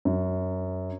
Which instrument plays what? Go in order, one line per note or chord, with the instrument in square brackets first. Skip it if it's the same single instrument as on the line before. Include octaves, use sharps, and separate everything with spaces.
[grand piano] F#2